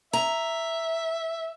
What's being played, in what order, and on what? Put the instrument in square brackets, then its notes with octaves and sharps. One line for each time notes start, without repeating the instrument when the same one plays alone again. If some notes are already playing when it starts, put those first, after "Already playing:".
[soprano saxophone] E5 [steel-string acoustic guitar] A#5